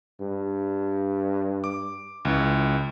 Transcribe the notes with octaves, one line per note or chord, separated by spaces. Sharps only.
G2
D6
C#2 E4